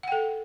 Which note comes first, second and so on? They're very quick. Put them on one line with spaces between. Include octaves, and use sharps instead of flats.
F#5 G5 A4